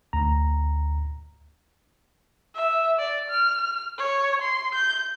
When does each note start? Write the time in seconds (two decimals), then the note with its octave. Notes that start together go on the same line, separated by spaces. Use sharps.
0.13 D2 A#5
2.55 E5
2.99 D5
3.30 F6
3.98 C#5
4.42 C6
4.75 G6